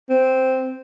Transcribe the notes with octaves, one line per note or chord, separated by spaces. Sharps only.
C4